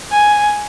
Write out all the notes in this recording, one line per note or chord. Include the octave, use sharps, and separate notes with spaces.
G#5